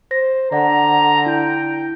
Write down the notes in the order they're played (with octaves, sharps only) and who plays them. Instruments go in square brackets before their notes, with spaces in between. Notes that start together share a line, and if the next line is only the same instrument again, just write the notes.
[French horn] C5 [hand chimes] A#6
[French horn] D3 [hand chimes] D5 F#5 [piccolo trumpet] A#5
[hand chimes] E4 [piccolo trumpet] G5